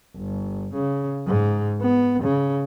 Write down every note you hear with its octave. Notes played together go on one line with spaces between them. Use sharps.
G1
C#3
G#2
B3
C#3